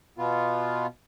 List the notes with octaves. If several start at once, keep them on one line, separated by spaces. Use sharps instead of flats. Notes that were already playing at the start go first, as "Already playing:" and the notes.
B2 B3 F4